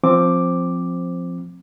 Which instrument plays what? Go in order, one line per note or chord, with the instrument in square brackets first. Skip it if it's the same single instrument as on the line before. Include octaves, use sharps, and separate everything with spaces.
[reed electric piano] F3 C4 D6